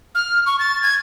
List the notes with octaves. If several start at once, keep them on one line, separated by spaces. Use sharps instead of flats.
F6
C#6
A6
G#6